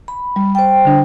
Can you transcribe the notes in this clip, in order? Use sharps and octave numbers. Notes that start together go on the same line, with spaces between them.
B5
G3
C5 G5
D3 D4